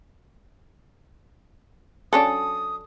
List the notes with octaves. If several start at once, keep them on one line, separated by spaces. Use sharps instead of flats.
F#3 C#4 D4 A4 D5 D#6